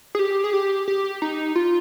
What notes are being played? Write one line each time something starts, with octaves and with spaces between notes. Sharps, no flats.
G#4
G4
G#4
G4
G4
D#4
F4